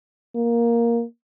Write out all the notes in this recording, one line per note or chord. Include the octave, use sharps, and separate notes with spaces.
A#3